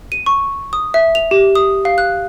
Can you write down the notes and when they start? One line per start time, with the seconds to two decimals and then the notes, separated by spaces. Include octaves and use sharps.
0.12 D#7
0.26 C#6
0.73 D#6
0.94 E5
1.15 F7
1.31 G4
1.55 D#6
1.85 F5
1.98 F#6